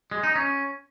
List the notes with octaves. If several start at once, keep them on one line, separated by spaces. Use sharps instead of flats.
G#3
D#4
C#4